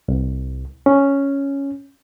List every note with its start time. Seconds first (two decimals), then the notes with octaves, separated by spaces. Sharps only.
0.08 C2
0.86 C#4